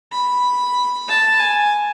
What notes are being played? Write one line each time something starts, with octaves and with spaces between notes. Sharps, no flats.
B5
A5
G#5